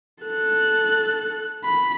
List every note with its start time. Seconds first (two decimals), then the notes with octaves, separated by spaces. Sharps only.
0.23 A4 F#6
1.64 B5